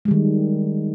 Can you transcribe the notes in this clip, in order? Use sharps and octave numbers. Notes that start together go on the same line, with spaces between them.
D#3 G3 G#3